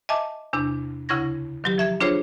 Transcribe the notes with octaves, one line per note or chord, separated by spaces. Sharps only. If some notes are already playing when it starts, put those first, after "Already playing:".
D#5 E5 G#5 A5 D6
E2 C3 D4
D2 C#3 E4 C#6 G#6 A#6
D#3 F#3 G4
F3 E5 G#6
D4 F4 G#4 C5 C#5